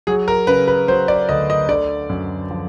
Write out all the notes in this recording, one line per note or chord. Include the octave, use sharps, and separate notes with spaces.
F#3 G#4
A#4
C#3 B4
B4
F#3 C5
D5
D2 D#5
D#5
D3 D5
F#2
F3